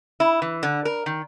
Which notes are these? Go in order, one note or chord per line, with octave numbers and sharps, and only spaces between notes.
E4
E3
D3
A#4
D#3